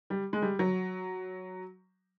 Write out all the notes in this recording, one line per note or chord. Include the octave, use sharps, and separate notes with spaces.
G3
G#3
G3
F#3